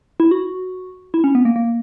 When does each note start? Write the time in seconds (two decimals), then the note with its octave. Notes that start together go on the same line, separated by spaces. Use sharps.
0.20 E4
0.31 F#4
1.14 E4
1.24 C#4
1.35 B3
1.45 A#3
1.56 A#3